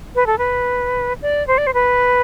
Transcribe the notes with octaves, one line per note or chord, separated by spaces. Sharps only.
B4
A4
B4
D5
C5
D5
C5
B4